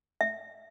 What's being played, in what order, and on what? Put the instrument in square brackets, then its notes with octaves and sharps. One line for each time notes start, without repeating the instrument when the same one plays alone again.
[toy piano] E5